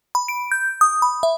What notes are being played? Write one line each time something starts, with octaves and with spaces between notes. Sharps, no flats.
B5
D7
G6
D#6
B5
E5